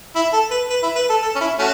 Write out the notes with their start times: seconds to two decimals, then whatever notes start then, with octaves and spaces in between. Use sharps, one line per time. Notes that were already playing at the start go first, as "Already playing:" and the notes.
0.16 E4
0.33 A4
0.51 B4
0.70 B4
0.83 E4
0.96 B4
1.09 A4
1.22 A4
1.35 C#4
1.41 E4
1.58 A3 C#4 F#4